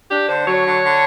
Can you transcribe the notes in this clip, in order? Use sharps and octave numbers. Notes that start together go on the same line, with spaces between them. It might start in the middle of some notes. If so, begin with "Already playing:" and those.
D4 G4
D3 C5
F#3 C#5
D3
D3